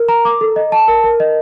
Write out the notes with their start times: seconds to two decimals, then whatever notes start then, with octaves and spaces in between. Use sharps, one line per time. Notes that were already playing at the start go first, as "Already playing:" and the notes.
Already playing: A#4
0.08 A#5
0.25 D6
0.41 A4
0.56 D#5
0.72 A5
0.88 A#4
1.04 A#4
1.20 D#5